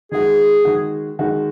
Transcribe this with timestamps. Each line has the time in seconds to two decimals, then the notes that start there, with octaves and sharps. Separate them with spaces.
0.12 D#3 G#3 F#4 G#4
0.65 D#3 G#3 F#4
1.19 D#3 G#3 F#4